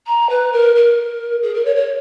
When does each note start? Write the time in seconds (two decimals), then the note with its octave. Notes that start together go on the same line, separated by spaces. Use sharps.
0.07 A#5
0.30 B4
0.53 A#4
0.75 A#4
1.43 G#4
1.54 A#4
1.65 C#5
1.76 C#5